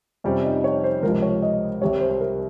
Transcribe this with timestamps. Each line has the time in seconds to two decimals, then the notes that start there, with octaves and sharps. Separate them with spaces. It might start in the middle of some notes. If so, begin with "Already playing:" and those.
0.24 F2 C3 G3 C#4
0.44 D#4
0.64 C#5
0.84 C5
1.03 C#2 C3 F3 A#4
1.22 C#5
1.42 D#5
1.81 C2 C3 G3 C#5
2.00 C5
2.11 C5
2.20 A#4